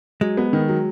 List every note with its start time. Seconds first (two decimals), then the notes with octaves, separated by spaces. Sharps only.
0.21 F#3 G#3
0.37 B3
0.53 D#3
0.68 F#3